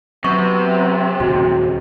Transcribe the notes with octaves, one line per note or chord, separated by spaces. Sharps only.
C3 F#3 B3 C#6
D#2 A#2 C#3 G#3 F#4